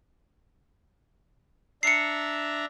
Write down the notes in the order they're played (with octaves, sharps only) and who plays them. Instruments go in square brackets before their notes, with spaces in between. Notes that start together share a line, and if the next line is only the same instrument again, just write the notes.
[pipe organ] D4 E5 A#5 [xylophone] C7 C#7